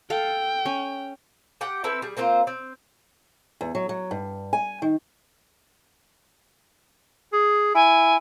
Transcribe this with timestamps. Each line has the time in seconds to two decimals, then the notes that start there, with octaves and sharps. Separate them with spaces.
0.10 A4 F5 G5
0.66 C#4
1.61 G4 F#5 G5
1.84 C4 E4 A4 B4
2.02 G3 G#4
2.17 A#3 C4 F4 C5
2.47 C4
3.61 E2
3.75 F#3
3.89 F#3
4.11 G2
4.53 G#5
4.82 D#3
7.33 G#4
7.75 E4 G#5